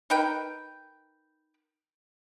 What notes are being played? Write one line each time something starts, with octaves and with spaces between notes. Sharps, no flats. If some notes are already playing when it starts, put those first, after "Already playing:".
D#4 A#4 B4 G5